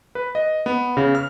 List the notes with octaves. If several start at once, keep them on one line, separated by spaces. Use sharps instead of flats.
B4
D#5
B3
C#3
F6